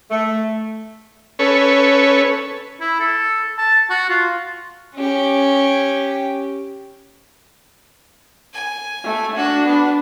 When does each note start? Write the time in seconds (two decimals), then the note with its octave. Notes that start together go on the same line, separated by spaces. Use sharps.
0.11 A3
1.39 C#4 A4 B4 C#5
2.80 E4
3.00 A4
3.58 A5
3.90 F#4
4.09 F4
4.96 C#4 G4
8.54 G#5
9.04 A3
9.36 D4 F#4
9.66 B3